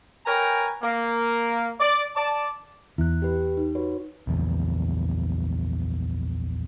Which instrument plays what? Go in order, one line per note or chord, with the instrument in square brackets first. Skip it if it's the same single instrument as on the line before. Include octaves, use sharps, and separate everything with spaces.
[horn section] A#4 B4 C#5 G5 G#5 A#5
A#3
D5
D5 A5
[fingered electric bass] E2 [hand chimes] E4 F#6
[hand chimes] G4 B4
D#4
F#4 B4 C#5
[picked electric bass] A#1 E2